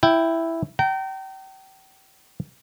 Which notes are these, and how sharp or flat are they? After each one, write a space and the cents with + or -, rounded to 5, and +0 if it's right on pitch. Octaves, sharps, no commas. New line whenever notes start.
E4 +0 G5 +0
G5 -30 A#5 -30